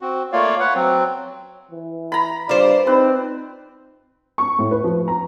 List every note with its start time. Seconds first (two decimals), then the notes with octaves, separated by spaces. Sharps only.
0.01 C4 F#4
0.32 A3 A#3 F4 C#5 D5 F5
0.60 B4 C#5 F#5
0.75 F#3 C4
1.71 E3
2.12 A#5 B5
2.49 G2 F4 C5 D5
2.87 C4 D#4 B4
4.38 C#6
4.59 A2
4.71 B4
4.84 F3
5.08 A#5